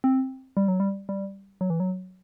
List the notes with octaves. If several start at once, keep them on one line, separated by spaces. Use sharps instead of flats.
C4
G3
F#3
G3
G3
F#3
E3
F#3